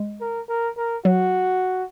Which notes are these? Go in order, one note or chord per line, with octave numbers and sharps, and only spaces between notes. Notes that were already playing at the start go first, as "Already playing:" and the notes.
Already playing: G#3
A#4
A#4
A#4
F#3 F#4